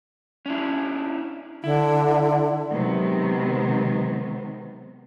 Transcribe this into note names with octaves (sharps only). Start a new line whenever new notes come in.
C#4 D4 E4
D3 E4
C3 D#3 F#3 G#3 B3